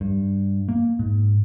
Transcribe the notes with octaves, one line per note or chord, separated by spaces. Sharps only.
G2
A#3
G#2